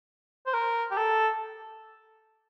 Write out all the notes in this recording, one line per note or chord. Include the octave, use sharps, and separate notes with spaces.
C5
A#4
G4
A4